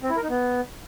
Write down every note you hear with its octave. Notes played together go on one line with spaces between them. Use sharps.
C4
E4
A#4
D#4
B3